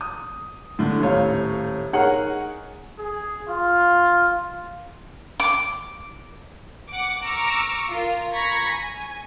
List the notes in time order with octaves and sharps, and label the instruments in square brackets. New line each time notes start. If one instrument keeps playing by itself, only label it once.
[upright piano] D#6
A2 D3 A3
D#1 A2 C#5 F5
D#4 G#4 A#4 C#5 F#5
[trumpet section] G#4
F4
[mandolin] D6
[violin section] F#5 D6
A#5 C#6 D6 E6 F6
F4 A#4
A#5 B5 C#6 G#6 A#6 B6
G#5